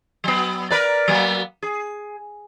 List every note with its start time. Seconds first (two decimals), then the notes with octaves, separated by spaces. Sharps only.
0.24 F#3 B3
0.70 A#4 B4 D5
1.08 F#3 A#3 B3
1.62 G#4